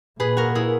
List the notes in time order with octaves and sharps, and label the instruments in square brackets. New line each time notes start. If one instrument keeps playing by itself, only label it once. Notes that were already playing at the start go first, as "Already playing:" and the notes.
[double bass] A#2 [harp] G#4 B4
[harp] F#4 A#4
E4 G#4